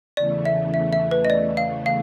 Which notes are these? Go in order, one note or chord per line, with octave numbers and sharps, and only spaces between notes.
E2 C#3 E3 A3 D5
E5
E5
E5
B4
D#5
D5
F5
F5